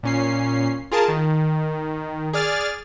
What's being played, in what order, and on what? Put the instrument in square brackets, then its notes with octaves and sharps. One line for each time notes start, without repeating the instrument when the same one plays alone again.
[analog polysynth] A#2 C#4 C7
F4 G#4 A#4 A5
D#3
G#4 D5 F6 A6